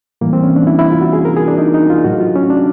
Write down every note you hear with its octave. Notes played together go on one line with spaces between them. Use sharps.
A2 E3 G3 A#3
C4
C#4
D4
E4
E4
F4
F#4
G#4
A#4
G#4
D4
D#4
D#4
F4
A2 F#3 F#4
F4
C#4
D4